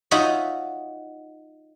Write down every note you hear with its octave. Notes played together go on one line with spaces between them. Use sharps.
D#4 F4 F#4 C#5 D#5 E5